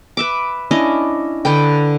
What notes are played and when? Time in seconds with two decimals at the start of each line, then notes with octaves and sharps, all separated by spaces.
0.17 B4 E5 D6
0.71 C#4 D4 E4 D#5
1.45 D3 B4 G5